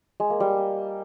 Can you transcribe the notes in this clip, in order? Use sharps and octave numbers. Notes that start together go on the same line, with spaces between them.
G#3
A#3
G3